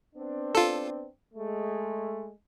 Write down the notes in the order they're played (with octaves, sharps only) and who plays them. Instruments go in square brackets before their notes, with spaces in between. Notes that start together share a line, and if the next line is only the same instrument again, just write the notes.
[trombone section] B3 C4 D4
[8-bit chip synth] F4 A4
[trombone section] G#3 A3